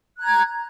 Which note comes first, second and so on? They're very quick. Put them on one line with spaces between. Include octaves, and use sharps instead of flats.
F#6 A#5 G#6